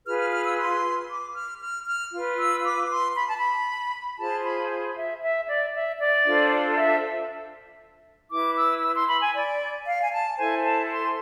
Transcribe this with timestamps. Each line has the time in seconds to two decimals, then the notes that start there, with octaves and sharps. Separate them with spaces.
0.06 F4 G#4 B4 F6
0.19 F6
0.32 F6
0.45 E6
0.58 C6
1.09 D6
1.35 F6
1.61 F6
1.86 F6
2.12 F4 B4
2.38 E6
2.64 D6
2.90 C6
3.15 B5
3.26 A5
3.37 B5
4.19 F4 G#4 C5 A5
4.44 B5
4.96 E5
5.22 E5
5.48 D5
5.73 E5
5.99 D5
6.25 D4 F4 A4 C5
6.76 E5
8.31 E4 B4 D6
8.57 E6
8.83 E6
8.95 C6
9.09 B5
9.22 G#5
9.34 D5
9.86 F5
10.01 G#5
10.12 A5
10.37 E4 A4 C5 G#5
10.63 A5
10.89 C6